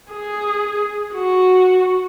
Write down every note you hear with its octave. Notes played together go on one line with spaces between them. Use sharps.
G#4
F#4